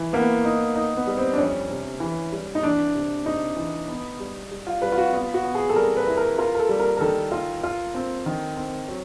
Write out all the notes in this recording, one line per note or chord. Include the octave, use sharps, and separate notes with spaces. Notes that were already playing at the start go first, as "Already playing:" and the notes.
Already playing: E3
A#3 B3
D#4
D#4
B3
G3
C4
D4
F2 C#4
C3
E3
G3
D#4
E3 D4
C3
C3 D#4
E3
B3
G3
G3
F4
G3 B4
F4
F#4
B3 F4
F#4
B3
G#4
A4
G3 A#4
B4
E4
A#4
F4 A#4
A#4
A4
G3
A#4
A#4
D#3 A4
F4
F4
C4
D#3
C4
F#3